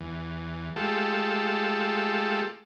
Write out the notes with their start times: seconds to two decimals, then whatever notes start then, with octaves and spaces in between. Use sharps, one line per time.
0.01 E2
0.76 G#3 A3 F4 G4 A4